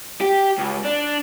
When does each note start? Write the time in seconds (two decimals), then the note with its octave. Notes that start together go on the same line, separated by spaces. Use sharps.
0.21 G4
0.58 C#2
0.85 D4